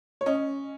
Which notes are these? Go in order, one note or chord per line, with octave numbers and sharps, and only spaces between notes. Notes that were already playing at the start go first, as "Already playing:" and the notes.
C#5
C#4 D#5